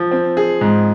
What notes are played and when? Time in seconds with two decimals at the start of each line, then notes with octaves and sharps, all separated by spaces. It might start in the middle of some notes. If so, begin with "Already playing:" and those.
Already playing: F3
0.11 C4
0.37 G#4
0.61 G#2